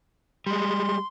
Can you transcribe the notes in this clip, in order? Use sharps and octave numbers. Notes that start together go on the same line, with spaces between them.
G3 G#3 C6